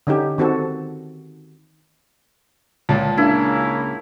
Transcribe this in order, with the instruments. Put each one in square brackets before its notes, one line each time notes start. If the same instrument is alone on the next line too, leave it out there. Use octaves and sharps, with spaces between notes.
[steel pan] D3 C#4 D#4 G4
D#3 C4 F#4 A4
[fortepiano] C#2 A#2 [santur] A5
[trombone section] C#3 A#3 [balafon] D4 [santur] E4